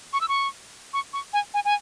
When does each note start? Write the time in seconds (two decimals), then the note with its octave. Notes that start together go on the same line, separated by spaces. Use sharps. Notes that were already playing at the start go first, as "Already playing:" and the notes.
0.13 C#6
0.21 E6
0.28 C#6
0.94 C#6
1.13 C#6
1.33 G#5
1.54 G#5
1.65 G#5